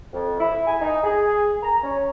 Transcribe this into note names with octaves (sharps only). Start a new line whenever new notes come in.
F2
E4
G#5
D#4
G#4
A#5
C#4